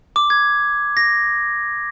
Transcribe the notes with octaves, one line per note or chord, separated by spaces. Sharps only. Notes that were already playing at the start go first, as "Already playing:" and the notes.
D6
G#6
A#6